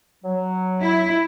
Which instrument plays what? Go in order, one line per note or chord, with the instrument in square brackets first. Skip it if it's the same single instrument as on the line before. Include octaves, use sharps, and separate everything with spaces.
[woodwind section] F#3
[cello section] E4